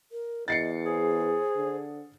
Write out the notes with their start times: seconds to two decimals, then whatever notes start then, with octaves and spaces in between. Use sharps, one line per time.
0.12 A#4
0.48 E2 D#5 A6 C7 C#7
0.86 G#4 C5
1.56 D3